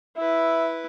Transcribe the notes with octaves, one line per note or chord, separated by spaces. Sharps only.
E4 B4 E5